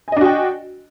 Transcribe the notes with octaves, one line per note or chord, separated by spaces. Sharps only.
D4 F#4 D#5 G5 G#5